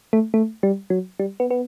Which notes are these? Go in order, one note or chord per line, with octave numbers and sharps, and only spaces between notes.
A3
A3
G3
F#3
G3
B3
B3